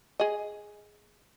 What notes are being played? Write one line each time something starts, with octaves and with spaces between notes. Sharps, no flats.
G#4 D#5